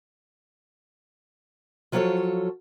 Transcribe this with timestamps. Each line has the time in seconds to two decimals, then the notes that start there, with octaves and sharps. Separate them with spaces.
1.92 F3 F#3 F4 G4 A4 C#5